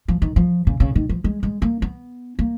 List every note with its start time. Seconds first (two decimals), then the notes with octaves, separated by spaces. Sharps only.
0.08 F3
0.22 D#3
0.36 F3
0.67 C#3
0.80 C#3
0.95 D#3
1.09 F3
1.24 G#3
1.43 G#3
1.62 A#3
1.82 B3
2.39 A#3